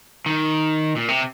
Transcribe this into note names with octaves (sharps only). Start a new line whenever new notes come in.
D#3
A#2
C3